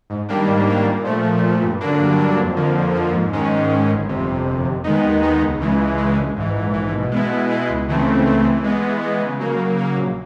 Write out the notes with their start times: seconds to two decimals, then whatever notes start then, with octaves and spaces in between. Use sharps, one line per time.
0.10 G#2
0.29 D#3 G3 A#3 D4
0.48 G#2
0.67 D#3 G3 A#3 D4
0.86 A#2
1.05 F3 A3
1.24 A#2
1.43 F3 A3
1.62 G2
1.81 D3 F#3 A#3 D4
1.99 G2
2.18 D3 F#3 A#3 D4
2.38 F2
2.56 D3 F3 A#3
2.75 F2
2.95 D3 F3 A#3
3.14 G#2
3.33 D#3 G#3 C#4
3.51 G#2
3.71 D#3 G#3 C#4
3.90 G1
4.08 F2 C3
4.27 G1
4.46 F2 C3
4.65 D#2
4.84 D#3 G#3 B3 D#4
5.03 D#2
5.22 D#3 G#3 B3 D#4
5.41 C#2
5.60 C#3 E3 G#3
5.79 C#2
5.98 C#3 E3 G#3
6.17 A#1
6.36 G#2 E3
6.55 A#1
6.74 G#2 E3
6.93 B2
7.11 G#3 B3 E4
7.31 B2
7.50 G#3 B3 E4
7.69 C#2
7.88 C#3 E3 A3 C4
8.07 C#2
8.26 C#3 E3 A3 C4
8.45 E3
8.64 G#3 B3
8.83 E3
9.02 G#3 B3
9.21 C#3
9.40 F#3 A#3
9.59 C#3
9.78 F#3 A#3
9.96 A#1